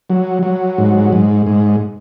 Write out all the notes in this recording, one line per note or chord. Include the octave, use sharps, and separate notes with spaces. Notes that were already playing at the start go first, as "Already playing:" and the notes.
F#3
F#3
G#2
G#2
G#2